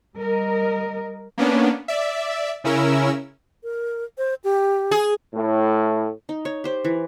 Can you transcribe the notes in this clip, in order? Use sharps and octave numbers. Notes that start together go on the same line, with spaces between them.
G3 A#4 D#5
A#3 B3 C#4 D4
D5 E5
C#3 C#4 E4 A#4 E6
A#4
C5
G4
G#4
A2
D#4
C#5
G4 C5
E3